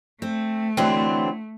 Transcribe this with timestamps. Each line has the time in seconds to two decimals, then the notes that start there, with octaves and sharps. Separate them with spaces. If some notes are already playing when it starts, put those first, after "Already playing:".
0.22 A3 C4
0.77 D3 E3 F#3 C4 D4 E4